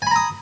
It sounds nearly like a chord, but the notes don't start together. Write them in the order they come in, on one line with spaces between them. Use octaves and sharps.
G#5 B5 A#5 D#6